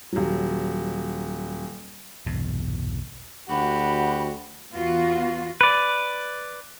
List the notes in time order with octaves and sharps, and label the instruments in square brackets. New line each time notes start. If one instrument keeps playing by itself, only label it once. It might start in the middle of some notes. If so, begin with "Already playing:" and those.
[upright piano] D#1 F#3
[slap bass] B1 E2 G2 C3
[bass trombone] D2 [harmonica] F#4 G4 [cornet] F#5 [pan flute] B5
[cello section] E2 B3 F4 F#4
[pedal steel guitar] B4 D5